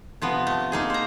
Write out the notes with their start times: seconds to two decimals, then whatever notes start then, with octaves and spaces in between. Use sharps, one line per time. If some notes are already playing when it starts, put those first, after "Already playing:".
0.22 C3 F3 B3
0.47 A3
0.72 A#3 D#4 G#4
0.90 C5 A#5